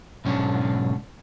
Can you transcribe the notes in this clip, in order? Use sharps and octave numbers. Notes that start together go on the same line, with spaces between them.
B1 G#2 C#4 D4